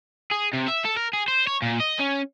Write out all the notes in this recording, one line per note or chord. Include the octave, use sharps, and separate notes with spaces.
G#4
C3
E5
A4
A#4
G#4
C5
C#5
A#2
D#5
C#4